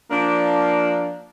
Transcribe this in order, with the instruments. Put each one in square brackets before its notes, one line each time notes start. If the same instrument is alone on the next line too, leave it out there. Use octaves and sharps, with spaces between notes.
[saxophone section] F3 A#3 D4